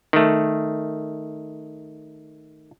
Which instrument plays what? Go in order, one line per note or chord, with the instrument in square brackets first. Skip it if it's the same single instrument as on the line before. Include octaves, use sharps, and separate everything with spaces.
[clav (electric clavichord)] D#3 A3